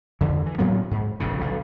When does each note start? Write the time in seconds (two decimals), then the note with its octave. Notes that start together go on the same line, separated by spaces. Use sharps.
0.21 F2 D3 E3
0.46 E3
0.58 A2 F#3 A#3 B3
0.91 G#2
1.20 F1 A#1 F2 C#3
1.41 B1 D3